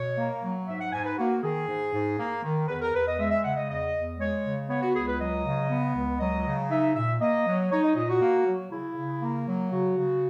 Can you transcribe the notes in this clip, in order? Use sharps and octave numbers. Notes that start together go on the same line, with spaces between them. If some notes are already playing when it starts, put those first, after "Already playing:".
Already playing: B2 C#5
A#3
F#3
G#2 E5
F#5
G#2 G#5
B4
A#3 F#4
D#3 G#4
G#2
G#2
A#3
D#3
E2 B4
A#4
E2 B4
D#5
G#3 E5
E5
C#3 F#5
D#5
E2 D#5
E2
G#3 C#5
C#3
B3 C#5
F#4
C#2 G#4
B4
F#3 D#5
C#3
B3
C#2
F#3 D#5
C#3
D#4 E5
A#2 E5
A#3 D#5
F#3
D#4 C#5
D#5
A#2 D#5
F#4
A#3
F#3
C#3 E4
C#3
A#3
F#3
C#3 F#4
C#3